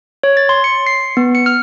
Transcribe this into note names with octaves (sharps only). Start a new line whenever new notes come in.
C#5
A6
C6
C#7
C7
B3
C#7
F6